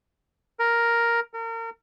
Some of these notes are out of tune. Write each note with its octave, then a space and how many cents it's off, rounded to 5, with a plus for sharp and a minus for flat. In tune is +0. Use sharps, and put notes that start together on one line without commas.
A#4 +5
A#4 -35